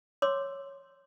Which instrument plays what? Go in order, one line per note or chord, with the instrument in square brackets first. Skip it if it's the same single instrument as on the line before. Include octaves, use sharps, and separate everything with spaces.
[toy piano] C#5 C6 D6 E6